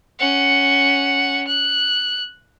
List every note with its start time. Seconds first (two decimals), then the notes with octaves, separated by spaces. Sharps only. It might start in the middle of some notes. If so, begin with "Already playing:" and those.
0.19 C#4 F#5
1.47 F#6